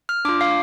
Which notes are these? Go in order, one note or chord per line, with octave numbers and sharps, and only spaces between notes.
F6
D4 F4 D6
F5